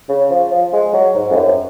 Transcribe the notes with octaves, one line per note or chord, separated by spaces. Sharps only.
C#3
F3
F3
G#3
F#3
G#2
F2
F#2